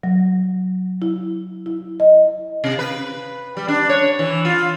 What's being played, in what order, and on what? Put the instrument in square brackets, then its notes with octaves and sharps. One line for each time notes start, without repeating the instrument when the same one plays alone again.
[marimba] F#3
E4
E4
D#5
[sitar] C3
B4
G3
D4
C#5
E3
F4